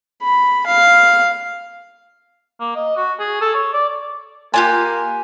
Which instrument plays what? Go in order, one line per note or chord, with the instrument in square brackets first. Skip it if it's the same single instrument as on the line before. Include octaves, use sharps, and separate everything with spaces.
[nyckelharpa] B5
F5
[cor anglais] A#3
D#5
F#4
G#4
A4
C#5
D5
[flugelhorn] A#3 [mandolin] D4 F4 G4 [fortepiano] G#5 [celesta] C6 F#6